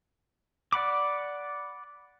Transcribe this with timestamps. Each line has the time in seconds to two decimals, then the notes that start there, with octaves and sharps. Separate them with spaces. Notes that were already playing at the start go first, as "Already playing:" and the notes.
0.73 D5 F#5 B5 D6